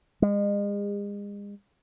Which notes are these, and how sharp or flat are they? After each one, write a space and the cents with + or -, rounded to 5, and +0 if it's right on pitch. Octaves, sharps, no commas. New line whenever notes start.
G#3 -40